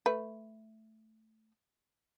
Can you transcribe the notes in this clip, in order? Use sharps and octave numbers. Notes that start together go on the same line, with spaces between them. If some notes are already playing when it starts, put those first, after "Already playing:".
A3 B4